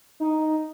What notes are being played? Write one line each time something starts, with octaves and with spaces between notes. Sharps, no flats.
D#4